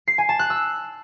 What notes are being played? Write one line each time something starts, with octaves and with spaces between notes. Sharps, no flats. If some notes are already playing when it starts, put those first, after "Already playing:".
C7
G#5
A5
F#6
E6